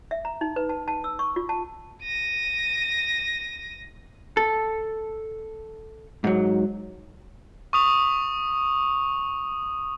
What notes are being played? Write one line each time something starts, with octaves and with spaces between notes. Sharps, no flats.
E5
A#5
D#4
B4
A5
A5
E6
C#6
F4
A5
A#6 D#7
A4
G#2 F#3
C#6 D#6 F7